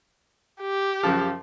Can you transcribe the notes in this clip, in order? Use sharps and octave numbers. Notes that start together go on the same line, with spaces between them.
G4
F#2 C#3 F3